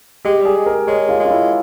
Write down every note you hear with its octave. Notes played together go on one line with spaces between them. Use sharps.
G#3 G4
G3 G#4
G#3
A#4
G#3 C#5
F4
G#3
F4
E4